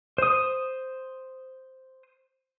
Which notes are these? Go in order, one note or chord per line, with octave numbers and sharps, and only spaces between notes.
C5 D#6